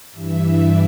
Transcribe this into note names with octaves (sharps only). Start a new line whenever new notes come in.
G2 E3 E5
D5